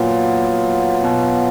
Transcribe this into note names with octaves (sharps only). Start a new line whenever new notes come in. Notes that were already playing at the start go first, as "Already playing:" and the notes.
Already playing: A#2 F#3 B3 F4
B2